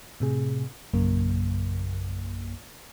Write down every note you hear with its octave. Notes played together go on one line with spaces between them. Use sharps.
A2 C3 G#4
A#1 F#2 C#3 A#3